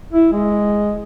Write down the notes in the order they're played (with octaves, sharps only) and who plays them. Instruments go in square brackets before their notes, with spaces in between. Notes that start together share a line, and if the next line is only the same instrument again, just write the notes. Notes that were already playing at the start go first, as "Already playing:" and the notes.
[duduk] E4
G#3